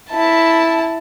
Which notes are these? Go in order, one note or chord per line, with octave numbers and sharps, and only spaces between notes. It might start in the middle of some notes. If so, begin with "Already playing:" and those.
E4 A5